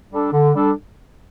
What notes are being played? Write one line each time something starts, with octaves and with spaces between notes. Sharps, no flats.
G3 D4 A4
D3
G3 D4 A4